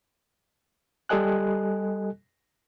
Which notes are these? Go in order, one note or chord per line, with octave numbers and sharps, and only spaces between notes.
G3 G4 A4 D#5 G#5 F#6